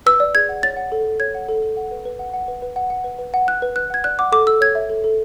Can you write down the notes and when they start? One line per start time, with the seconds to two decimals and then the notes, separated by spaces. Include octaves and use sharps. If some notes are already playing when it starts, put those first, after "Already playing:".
0.06 B4 E6
0.20 D5
0.35 G#4 G#6
0.49 F#5
0.63 C#5 A6
0.77 F#5
0.92 A4
1.05 A4
1.20 C#5 G#6
1.35 F#5
1.49 A4
1.62 A4
1.77 F#5
1.91 B4
2.05 B4
2.19 F#5
2.34 F#5
2.48 B4
2.62 B4
2.76 F#5
2.90 F#5
3.04 B4
3.19 B4
3.34 F#5
3.47 F#5 F#6
3.62 B4
3.76 B4 F#6
3.90 F#5 G#6
4.04 D5 F#6
4.19 F#5 D6
4.32 A4 D6
4.47 A4 E6
4.61 C#5 G#6
4.75 E5
4.90 A4
5.04 A4